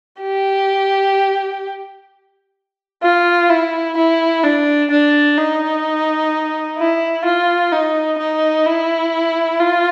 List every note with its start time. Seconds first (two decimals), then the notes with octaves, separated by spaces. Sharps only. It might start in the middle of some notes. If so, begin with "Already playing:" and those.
0.21 G4
3.03 F4
3.50 E4
3.97 E4
4.44 D4
4.90 D4
5.37 D#4
6.78 E4
7.25 F4
7.72 D#4
8.19 D#4
8.66 E4
9.60 F4